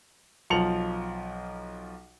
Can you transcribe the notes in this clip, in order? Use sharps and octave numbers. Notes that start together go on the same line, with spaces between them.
B1 F3 C#7 F7 F#7